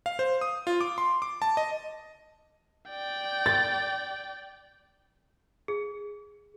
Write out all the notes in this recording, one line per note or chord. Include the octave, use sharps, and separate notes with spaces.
F5
C5
D#6
F4
D6
C6
D6
A5
D#5
D5 G5
A6
G#4